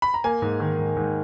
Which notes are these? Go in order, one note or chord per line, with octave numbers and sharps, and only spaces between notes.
B5
A#5
A#3 G#5
G#2
D#3
G#2
G#2